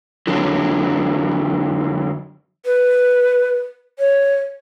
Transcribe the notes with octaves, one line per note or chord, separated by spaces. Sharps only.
F2 D3 F#3
B4
C#5